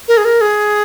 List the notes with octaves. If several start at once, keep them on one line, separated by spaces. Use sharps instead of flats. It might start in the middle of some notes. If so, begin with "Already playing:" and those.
A#4
G#4
A#4
G#4